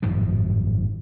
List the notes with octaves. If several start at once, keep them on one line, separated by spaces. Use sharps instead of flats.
G#1 F#2 A2 F3